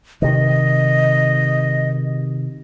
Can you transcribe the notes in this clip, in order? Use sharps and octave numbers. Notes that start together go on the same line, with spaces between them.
C3 D#3 D#5